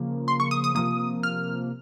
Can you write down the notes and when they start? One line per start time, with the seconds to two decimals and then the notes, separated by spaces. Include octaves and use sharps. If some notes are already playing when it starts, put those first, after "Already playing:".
Already playing: C#3 F3 A#3
0.28 C6
0.40 C#6
0.51 D#6
0.64 D#6
0.75 C3 F3 A#3 D#6
1.23 F6